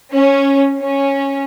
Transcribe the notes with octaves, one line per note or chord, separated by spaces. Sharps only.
C#4
C#4